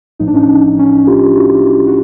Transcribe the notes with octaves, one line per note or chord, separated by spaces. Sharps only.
A1 A2 F3 D#4
D4
C#4 D#4
C#4 D#4
F4 G4
E4 F#4
F#4